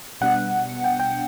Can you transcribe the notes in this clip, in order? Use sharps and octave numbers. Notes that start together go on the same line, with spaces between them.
B2 G3 B3 D4 F#5
G5
G5